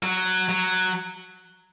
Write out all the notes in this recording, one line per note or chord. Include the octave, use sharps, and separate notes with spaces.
F#3
F#3